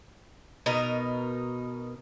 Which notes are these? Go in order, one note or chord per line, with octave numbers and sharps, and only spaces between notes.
B2 D#4 A#4